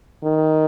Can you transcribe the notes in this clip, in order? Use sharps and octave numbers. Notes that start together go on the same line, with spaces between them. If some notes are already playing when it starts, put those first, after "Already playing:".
D#3